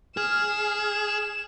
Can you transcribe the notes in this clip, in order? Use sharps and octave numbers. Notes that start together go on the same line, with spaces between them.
G#4 F6 E7